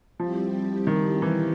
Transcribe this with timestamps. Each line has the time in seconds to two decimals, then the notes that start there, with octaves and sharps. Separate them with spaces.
0.19 F3 G3 C4 E4 G4
0.87 D#3
1.22 E3